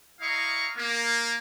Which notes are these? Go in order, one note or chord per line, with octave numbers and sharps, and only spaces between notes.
E4 D#5 F5 A#5 C#6
A#3